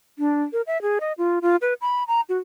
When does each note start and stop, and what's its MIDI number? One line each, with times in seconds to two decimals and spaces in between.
0.19 0.43 62
0.53 0.62 70
0.67 0.81 76
0.82 0.99 68
1.01 1.13 75
1.18 1.39 65
1.42 1.56 65
1.61 1.74 71
1.81 2.04 83
2.08 2.21 82
2.29 2.38 66